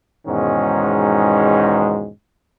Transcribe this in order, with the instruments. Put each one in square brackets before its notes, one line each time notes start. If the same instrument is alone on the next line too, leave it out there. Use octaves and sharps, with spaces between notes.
[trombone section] E2 G#2 B2 D#3 G#3 C#4